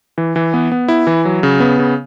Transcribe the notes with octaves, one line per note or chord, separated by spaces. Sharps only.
E3
E3
B3
B3
E4
E3
F#3
C#3
B3
C#3